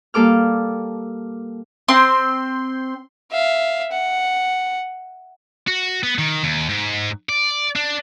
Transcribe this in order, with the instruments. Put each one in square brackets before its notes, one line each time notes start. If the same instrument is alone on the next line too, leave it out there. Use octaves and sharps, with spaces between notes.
[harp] G3 A#3 A4 D6 F6
[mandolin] C4 [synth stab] C6
[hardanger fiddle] E5 F5
F#5
[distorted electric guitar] F#4
B3
D#3
D#2
G#2
D5
D4